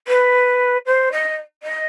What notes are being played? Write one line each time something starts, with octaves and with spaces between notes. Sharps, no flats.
B4
C5
D#5
D#5